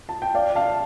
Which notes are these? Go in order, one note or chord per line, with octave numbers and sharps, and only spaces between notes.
A5
G5
D5 F5
F5 A5